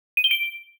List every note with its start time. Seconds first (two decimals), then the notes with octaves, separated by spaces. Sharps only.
0.17 D#7
0.24 G7
0.31 D7